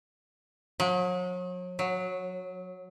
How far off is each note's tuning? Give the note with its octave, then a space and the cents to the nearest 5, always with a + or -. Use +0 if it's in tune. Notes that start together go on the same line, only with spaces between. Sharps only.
F#3 -40
F#3 -10